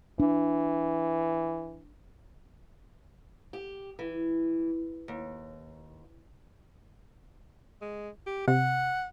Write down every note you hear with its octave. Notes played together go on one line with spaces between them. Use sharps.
E3 D4
G4
E3
D#2
G#3
G4
C3 F#5